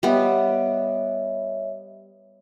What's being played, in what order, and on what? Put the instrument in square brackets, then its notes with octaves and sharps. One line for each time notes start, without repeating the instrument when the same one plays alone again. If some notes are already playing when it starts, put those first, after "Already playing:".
[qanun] G3 B3 [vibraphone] C#5 D#5 E5